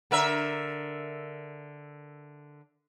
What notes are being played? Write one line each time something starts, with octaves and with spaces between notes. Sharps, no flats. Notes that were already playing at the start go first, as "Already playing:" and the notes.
D3 A#4 E5